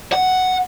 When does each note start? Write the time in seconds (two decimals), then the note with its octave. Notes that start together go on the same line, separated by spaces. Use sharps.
0.12 F#5